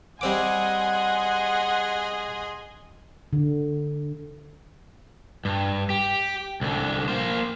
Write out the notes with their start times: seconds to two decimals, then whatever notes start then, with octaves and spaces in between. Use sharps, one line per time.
0.21 G3 C4 G#4 D#5 F#5 G#5 C6 D6
3.33 D3
5.45 G2
5.90 G4
6.61 C2 D3
7.08 A#3 C5